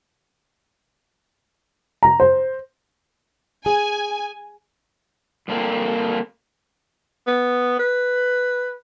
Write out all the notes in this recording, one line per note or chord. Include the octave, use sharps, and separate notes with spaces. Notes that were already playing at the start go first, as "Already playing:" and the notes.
A#5
C5
G#4 G#5
G2 D3 A#3 C4
B3
B4